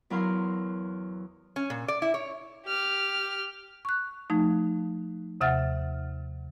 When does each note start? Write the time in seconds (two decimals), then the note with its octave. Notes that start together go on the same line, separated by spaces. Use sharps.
0.10 E2 F#3 E4 A#4 F5 C6
1.56 C#4
1.70 A#2
1.88 D5
2.02 E4
2.14 C#5
2.66 G4 F6
3.85 C#6 F#6
4.30 F3 A3 D#4
5.41 D#2 C3 E5 F#5 F6 A6